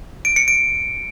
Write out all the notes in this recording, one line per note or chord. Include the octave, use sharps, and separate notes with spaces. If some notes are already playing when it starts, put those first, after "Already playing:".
D7
C#7
D7